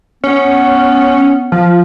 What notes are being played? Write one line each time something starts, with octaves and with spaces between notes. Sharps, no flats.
B3 C#4
F3